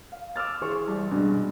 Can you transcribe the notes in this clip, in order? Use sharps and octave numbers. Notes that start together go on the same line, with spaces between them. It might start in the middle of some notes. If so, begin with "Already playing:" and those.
F5
D6 E6 F6 A6
E3 G#4 C5 C#6
C2
G2 B2 G#3